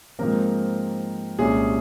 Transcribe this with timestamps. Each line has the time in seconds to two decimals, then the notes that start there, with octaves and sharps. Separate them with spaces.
0.19 G#2 F3 A#3 C4 A#4
1.38 C2 A#2 G#3 C#4 G#4